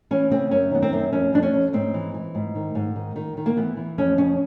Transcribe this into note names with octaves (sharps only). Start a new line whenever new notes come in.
E3 C#4
C#3 C4
F#2 C#4
D#3 B3
C4
F#2
F2 C#4
F2 D4
C#4
F2
G#2 C4
E3
E3
G#2
D#3
G#2
D#3
D#3
D#3
A#3
E3 B3
E3
F2 C#4
C#3 C#4